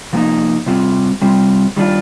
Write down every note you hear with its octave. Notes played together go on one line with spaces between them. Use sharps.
C3 F3 A#3 D#4
C3 G3 C4 F4
C3 G3 C4 F4
D#3 G3 D4 F4